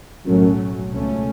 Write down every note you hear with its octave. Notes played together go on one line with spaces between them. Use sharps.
B1 F#2 A2 F#3 A3 C#4
C#2 B2 A3 C#4